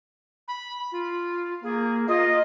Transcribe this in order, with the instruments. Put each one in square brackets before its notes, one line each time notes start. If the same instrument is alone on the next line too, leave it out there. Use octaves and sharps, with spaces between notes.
[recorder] B5
F4
[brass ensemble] A#3 [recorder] G#4
[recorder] F4 [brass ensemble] D#5